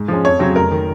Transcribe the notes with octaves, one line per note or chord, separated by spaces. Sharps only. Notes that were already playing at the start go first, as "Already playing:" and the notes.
Already playing: G#2
F3 G#3 C#4
F2 C#5
C#3 F#3 C4
F1 A#4
D#3